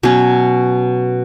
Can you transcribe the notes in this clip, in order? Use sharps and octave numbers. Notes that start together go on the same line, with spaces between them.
B2 F#3 C#4